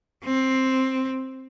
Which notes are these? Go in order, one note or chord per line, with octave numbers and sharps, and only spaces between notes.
C4